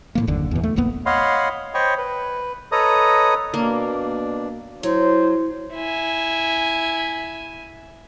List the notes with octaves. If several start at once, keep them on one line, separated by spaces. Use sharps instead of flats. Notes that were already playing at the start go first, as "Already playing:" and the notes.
A2 D#3 A#3
F#1 D#2 D3
E2 B2
A3
D1 A1 A#3 B3
C#5 D#5 F5 F#5 B5 C6
C5 C#5 D#5 G5 B5 C#6
B4
A4 B4 C#5 D#5 A#5 D#6
B2 A#3 D4 D5
F#3 E4 C5
E4 G#5